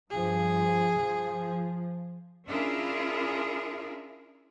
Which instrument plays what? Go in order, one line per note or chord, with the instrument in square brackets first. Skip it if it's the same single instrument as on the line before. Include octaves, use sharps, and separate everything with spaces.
[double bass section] G2 F3 [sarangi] G#4
[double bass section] F3
[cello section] C#4 D4 E4 F4 G#4 A#4